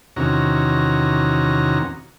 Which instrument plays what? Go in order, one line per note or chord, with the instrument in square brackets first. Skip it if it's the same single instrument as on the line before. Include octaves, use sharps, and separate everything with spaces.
[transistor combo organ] E2 C3 D#3 C#4 F#4 A#5